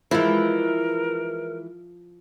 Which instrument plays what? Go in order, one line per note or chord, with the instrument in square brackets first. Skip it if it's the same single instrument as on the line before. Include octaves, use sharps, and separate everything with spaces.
[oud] E3 G#3 [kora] F3 [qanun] E4 [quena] A#4